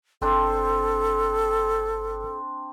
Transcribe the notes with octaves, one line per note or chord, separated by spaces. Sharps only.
G1 C4 D4 A4 C5